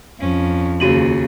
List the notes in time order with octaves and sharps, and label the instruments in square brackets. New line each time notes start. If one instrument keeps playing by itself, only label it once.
[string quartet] F2 [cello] C#4
[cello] D#2 C#3 [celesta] F#4 D#7 F#7